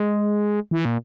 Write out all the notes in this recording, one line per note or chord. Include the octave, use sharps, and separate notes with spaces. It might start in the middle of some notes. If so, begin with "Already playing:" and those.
Already playing: G#3
E3
A#2